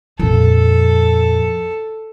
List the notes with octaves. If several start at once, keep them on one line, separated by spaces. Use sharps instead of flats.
A#1 F2 A4